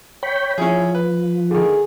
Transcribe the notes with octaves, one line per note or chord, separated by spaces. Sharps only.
C#5 G5 B5
F3 C#4 E4 G#4
B4
D3 D#3 G#4